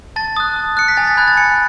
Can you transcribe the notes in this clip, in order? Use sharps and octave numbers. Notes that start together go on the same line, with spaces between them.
A5 A6
D#6 F#6
A5
D#6 F#6 C#7
B6
G#5 A6
A6
B5 F#6 G#6
A6
G#5 C#7